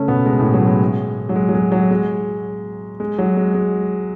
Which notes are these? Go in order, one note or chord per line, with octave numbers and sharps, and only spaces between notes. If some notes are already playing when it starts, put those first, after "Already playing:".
Already playing: C#3 A3 C#4 A4
B2 B3
G#3
A2 A3
F#3
G#3
F#3
G#3
F#3
G#3
F#3
G#3
G#3
F#3
G#3
G#3